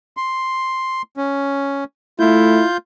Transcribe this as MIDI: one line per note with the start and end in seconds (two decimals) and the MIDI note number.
0.17 1.02 84
1.17 1.84 61
2.19 2.61 57
2.19 2.68 64
2.19 2.77 65
2.19 2.77 91